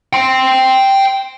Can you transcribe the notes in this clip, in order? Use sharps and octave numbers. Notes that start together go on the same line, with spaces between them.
G5 C6